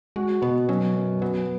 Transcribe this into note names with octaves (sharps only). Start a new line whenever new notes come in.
G#3 F#4
B2 B3
F#3 C#4
F#2
F#3 B3